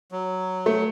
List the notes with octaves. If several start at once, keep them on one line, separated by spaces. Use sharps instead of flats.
F#3
A3